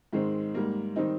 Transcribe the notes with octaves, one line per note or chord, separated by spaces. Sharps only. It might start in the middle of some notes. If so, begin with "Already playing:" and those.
G#2 D#3 G#3 C4
G#2 G3 A#3
D#3 G3 C4 D#4